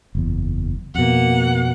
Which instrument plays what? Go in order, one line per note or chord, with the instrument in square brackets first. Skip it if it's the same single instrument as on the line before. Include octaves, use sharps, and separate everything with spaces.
[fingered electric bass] F#1 E2
[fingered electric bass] F2 B2 [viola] A#3 F#5